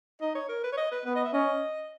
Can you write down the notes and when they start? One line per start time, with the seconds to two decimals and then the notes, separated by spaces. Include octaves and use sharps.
0.21 D#4 D#5
0.35 C#5
0.49 A#4
0.64 B4
0.72 C#5
0.78 D#5
0.92 B4
1.05 B3 B4
1.16 D#5
1.25 E5
1.33 C#4 D#5